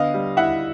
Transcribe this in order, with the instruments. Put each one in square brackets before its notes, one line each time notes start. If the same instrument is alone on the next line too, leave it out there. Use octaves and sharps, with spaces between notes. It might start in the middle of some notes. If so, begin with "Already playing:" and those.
Already playing: [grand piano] D3 B3 D#5 F5
G3
E4 E5 F#5